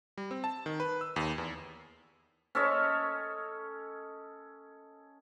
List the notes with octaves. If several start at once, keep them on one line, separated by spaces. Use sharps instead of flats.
G3
C4
A5
D#3
B4
E6
D#2
E2
C#4 A4 C#5 D#5